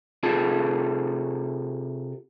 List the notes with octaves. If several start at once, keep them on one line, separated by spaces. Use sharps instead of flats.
C3 F4 G#4 A4 A5